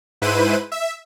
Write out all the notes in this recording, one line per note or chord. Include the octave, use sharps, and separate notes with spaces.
G#2 E4 B4 C5 D#7
E5